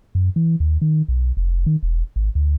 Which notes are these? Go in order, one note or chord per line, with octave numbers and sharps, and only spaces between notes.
F#2
E3
D#2
D#3
B1
F1
D#3
E1
G#1
D2